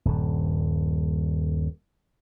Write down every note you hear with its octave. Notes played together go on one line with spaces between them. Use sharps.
D#1 G2